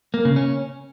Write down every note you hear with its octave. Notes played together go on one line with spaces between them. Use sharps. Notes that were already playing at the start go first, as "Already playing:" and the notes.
A#3
C#3
C#4